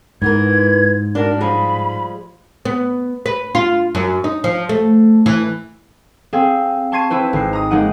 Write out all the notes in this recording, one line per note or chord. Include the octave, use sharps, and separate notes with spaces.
G#2 E3 B3 A#4 G#6
D4 F#4 A#4
F3 G3 G#3 B5
B3
B4
F4
F#2
D#4
F3
A3
E3
C4 G#4 F5
A5 C6 C#6 G#6 C7 D#7
C4 E4 B4 C5
G#1 C7
A#5 D#6
G#3 A#3 D#4 F#5 D#7